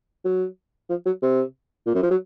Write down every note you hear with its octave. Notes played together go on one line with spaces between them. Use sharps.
F#3
F3
F#3
C3
A#2
F#2
F3
F#3